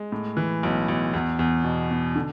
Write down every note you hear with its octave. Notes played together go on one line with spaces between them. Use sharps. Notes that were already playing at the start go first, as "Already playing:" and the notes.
Already playing: G#3
A2
E3
B1
B1
E2
E2
B2
B2
D3